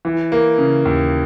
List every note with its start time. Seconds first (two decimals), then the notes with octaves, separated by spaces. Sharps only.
0.05 E3
0.32 A#3
0.58 C#3
0.85 D#2